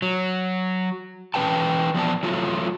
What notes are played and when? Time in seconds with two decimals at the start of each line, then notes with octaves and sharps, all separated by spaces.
0.02 F#3
1.34 E3 C#4 B4 G5 A5
1.94 F3 B3 D5 A5
2.23 F#3 A3 F4